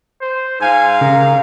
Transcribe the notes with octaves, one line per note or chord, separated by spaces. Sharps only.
C5
G#2 F5 G#5
C#3 A#4